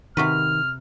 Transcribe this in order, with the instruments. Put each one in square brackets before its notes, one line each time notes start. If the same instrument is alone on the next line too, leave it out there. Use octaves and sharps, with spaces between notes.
[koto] C3 F#4 B4 [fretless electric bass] D#3 [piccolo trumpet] F6